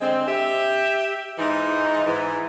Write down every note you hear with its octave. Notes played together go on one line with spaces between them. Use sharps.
D3 G#3 C4
G4 E5
G#2 E3 D#4
G#2 E3